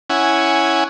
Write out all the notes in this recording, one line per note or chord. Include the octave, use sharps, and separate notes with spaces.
C#4 E4 F#5 G#5